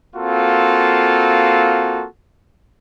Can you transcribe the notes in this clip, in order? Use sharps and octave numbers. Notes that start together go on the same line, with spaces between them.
A#3 C4 F4 F#4 A4